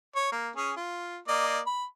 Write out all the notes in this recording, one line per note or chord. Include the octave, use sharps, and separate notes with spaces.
C#5
A#3
C#4 G#4
F4
A#3 D5 D#5
B5